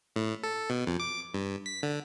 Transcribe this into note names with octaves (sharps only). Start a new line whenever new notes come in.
A2
A4
B2
F2
D6
G2
B6
D3